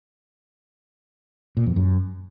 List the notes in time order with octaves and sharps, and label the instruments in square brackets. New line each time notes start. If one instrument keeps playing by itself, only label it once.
[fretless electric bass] A#2
F2
F#2